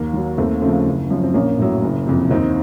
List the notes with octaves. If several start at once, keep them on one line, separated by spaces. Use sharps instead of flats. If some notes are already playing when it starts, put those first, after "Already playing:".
Already playing: D#2 A#3
D#3 F#3
D#2 A3 C4
C#3 F3 A3 C4
F#1
F#2 F3
C4
A#1 A#3 C#4
A2 F#3
F#1
F2 C3
D#2 C4 D#4